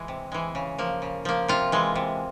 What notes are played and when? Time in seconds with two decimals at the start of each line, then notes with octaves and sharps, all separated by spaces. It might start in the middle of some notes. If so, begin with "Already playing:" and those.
Already playing: E3 G#3
0.08 C3
0.32 E3 G#3
0.55 C#3
0.78 F3 A#3
1.02 C#3
1.25 F3 A#3
1.48 C3 F4
1.72 E3 G#3
1.95 C3